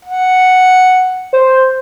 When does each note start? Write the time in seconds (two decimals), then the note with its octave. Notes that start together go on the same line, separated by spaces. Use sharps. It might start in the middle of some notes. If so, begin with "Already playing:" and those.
0.05 F#5
1.33 C5